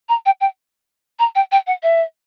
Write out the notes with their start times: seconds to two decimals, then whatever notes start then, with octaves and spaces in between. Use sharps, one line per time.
0.09 A#5
0.26 G5
0.41 G5
1.19 A#5
1.35 G5
1.52 G5
1.67 F#5
1.83 E5